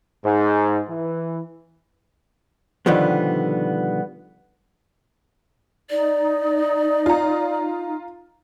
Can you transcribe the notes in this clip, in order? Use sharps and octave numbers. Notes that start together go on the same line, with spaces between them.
G#2
E3
B2 D3 D#3 F3 G3 B3
D#4 D5
F4 A#5